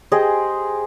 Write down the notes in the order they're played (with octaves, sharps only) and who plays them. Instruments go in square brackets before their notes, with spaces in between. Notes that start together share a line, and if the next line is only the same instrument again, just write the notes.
[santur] G4 G#4 C5 D#5